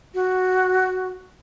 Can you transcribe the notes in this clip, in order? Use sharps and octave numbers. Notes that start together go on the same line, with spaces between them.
F#4